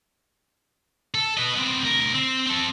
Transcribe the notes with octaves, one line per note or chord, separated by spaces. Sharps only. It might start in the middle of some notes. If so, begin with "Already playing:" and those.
A4
B4 D#5
B3 C4
D2 A#4
C4
C4 A4